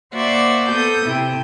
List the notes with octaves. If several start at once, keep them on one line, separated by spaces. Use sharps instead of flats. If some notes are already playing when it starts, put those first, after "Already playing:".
A#3 F#4 C5 D5 E5 F#5
B3 A4 D#6 G6
C3 E4 G5